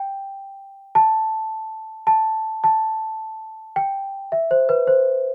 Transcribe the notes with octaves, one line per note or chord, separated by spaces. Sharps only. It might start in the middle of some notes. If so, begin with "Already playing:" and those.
Already playing: G5
A5
A5
A5
G5
E5
C5
B4
C5